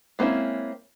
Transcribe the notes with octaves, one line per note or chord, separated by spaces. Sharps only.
G#3 A#3 C4 C#4 E4